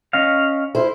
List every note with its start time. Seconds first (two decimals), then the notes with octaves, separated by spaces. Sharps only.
0.13 C#4 D#5 F5
0.75 E4 C5